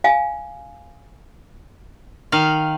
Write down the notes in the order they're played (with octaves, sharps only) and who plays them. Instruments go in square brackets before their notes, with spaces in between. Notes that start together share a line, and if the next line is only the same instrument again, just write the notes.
[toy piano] F5 G#5
[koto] D#3 F5